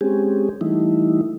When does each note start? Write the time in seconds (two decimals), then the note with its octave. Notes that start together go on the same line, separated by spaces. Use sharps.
0.01 G#3 C4 C#4 G4 G#4
0.61 E3 G3 A3 D#4 E4